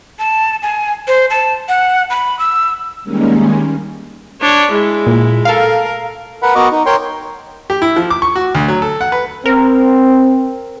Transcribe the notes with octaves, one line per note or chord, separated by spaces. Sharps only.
A5
G#5
C5
A5
F#5
B5
E6
D#3 G3 G#3 A#3 C#4
D4 C#5
G#3 E4
A#2
A4 A#4 F5
A#4 B4 F#5 B5
B3 F#4 A#4 D#5 C#6 D6
D#4
A#4 C#5 G5 C6
G4
E4
F3
D6
C#6
F#4
D2
F#3
A4
F#5
B4
C4 A#4